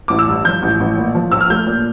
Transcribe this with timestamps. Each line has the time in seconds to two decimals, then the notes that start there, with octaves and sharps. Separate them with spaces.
0.08 A1 D6
0.19 E6
0.28 G2
0.45 F3 G6
0.63 A1
0.80 A1
0.97 A#2
1.15 F3
1.31 A#1 E6
1.41 F6
1.50 A3 G6
1.67 A#2